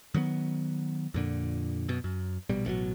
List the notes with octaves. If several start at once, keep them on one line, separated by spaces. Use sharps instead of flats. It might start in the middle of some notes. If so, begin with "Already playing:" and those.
D#3 F#3 G3 B3
F2 A#2 D3
F#2 B2
F#2
A#1 B2 G3
A1 G2 B2 F#3